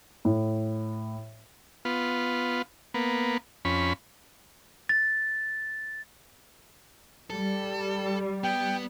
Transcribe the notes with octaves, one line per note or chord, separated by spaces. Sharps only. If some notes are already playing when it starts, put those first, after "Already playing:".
A2
B3 F4
A#3 B3
F2 C#4 B5
A6
G3 A4
B3 G5